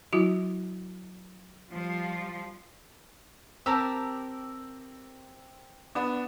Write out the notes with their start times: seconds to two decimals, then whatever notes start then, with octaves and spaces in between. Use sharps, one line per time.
0.13 F#3 E4 F#4
1.71 F3 G3 F4
3.66 C4 G4 A#4 A5 E6
5.95 B3 D4